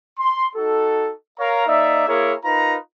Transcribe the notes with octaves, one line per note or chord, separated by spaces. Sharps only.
C6
D#4 F#4 A4
A#4 C#5 F5 A#5
A#3 D#4 D5 E5
A#3 E4 G#4 A#4 C#5
D#4 F4 A#4 B4 A#5